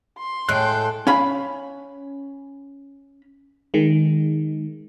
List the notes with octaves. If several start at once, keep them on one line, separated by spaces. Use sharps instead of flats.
C6
A2 G#3 A4 G5 F#6
C#4 F5 B5
D#3 G#3